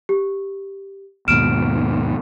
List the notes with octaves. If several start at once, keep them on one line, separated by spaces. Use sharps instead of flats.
G4
D#2 G#2 B2 F6 D7 E7